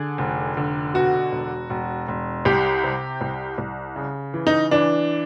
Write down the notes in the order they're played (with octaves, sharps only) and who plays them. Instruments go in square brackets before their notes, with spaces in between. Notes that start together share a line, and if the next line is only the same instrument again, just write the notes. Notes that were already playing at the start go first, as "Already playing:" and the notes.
Already playing: [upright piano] D3 G#4
F1
D3
B2 F#4
E1
E1
E1
C2 G4
C3
C2
C2
C#3
E3
D#4
E3 D4